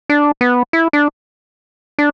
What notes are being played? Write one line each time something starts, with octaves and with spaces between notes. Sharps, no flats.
D4
B3
E4
D4
D4